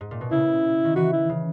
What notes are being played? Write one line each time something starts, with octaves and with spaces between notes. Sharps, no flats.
G#2
A#2
B2
C#3 E4
D#3
E3 F#4
E4
C#3